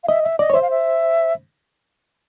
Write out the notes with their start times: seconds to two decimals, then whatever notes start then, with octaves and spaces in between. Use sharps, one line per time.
0.04 F5
0.08 D#5 E5
0.23 E5
0.39 D5 D#5
0.50 C#5
0.54 C5 E5
0.62 F5
0.70 E5